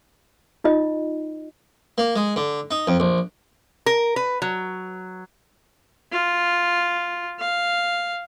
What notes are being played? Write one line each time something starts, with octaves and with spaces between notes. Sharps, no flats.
D#4 F4 D#5
A#3
G#3
D3
D#4
F2
A#1
A#4
B4
F#3
F4
F5